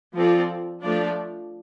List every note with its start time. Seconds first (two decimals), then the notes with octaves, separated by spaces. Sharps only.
0.15 F3 C4 F4 A4 D5
0.83 F3 A3 D4 F4 D5